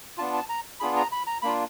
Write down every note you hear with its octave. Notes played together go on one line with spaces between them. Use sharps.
B3 D4 F4 A5
A5
A#5
B3 D4 F4 G#4 B5
A#5
B5
A#5
A#3 D4 F4 B5